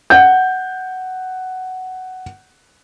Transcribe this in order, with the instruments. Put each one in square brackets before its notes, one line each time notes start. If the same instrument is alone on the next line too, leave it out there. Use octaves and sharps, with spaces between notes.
[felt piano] F#5 G6